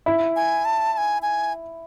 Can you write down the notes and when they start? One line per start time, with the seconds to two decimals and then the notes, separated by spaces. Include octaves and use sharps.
0.06 E4
0.36 G#5
0.65 A5
0.93 A5
0.97 G#5
1.22 G#5